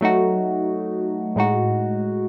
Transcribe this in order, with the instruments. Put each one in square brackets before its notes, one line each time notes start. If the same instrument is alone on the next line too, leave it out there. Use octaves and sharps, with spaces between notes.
[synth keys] F#3 A3 D#4 F#4
A2 G#3 D#4 F#4